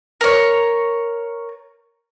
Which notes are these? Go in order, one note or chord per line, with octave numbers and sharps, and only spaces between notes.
A#4 C#5